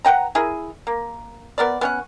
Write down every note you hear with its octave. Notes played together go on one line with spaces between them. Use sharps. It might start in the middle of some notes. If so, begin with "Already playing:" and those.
B4 F#5 G5 A#5
E4 G#4 A#4
A#3
B3 A#4 D5
B3 C#4 F#5